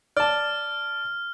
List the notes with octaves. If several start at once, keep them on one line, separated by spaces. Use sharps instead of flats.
D5 A5 F6